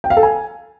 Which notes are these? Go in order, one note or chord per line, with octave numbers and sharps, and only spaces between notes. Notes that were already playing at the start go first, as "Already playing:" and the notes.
G5
F5
A4
G#5